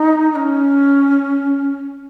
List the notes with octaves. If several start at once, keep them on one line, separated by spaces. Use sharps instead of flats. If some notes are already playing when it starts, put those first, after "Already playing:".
Already playing: D#4
D#4
C#4